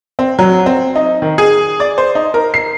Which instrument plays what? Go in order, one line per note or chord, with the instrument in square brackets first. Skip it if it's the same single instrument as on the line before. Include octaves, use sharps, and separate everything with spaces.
[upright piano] C4
F#3
C4
D#4
D#3
G#4
D5
C5
D#4
A#4
C7